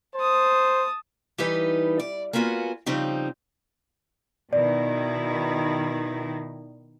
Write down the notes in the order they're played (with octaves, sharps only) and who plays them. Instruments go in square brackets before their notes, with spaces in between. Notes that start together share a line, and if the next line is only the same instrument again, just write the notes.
[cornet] C5 [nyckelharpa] A5 D#6
[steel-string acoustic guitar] E3 G3 D#4 B4
D5
A#3 B3 F4 F#4 F#5 G#5
C#3 F3 G3 C4 D#4
[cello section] B2 D#3 E4 [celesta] D5